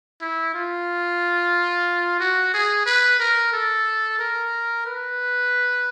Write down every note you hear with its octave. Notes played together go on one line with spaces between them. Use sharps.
E4
F4
F#4
G#4
B4
A#4
A4
A#4
B4